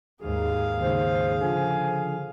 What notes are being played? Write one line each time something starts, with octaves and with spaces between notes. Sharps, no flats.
D#2 G#2 G#4 F5
D#2 G#2 C#3 C5
D3 F3 G#5